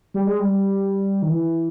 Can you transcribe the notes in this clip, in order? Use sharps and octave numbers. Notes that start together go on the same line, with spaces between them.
G3
G#3
G3
D#3
E3